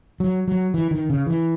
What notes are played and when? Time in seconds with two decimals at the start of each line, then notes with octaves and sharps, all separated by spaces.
0.20 F#3
0.48 F#3
0.74 E3
0.91 D#3
1.10 C#3
1.27 E3